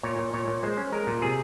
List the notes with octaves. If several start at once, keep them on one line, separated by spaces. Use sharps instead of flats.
A#2 C#5
A#2
A#2 C#5
A#2
G#3 C5
C#4
G#3 A#4
A#2
C3 G#4